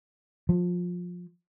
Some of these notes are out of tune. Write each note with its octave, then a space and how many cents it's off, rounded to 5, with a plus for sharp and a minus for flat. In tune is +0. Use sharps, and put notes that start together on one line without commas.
F3 +20